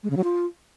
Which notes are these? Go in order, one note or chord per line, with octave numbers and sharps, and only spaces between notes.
G#3
C#3
F#3
F4